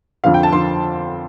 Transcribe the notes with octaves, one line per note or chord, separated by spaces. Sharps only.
F2 D3 F3 F5
G5
A5
D3 F3 C6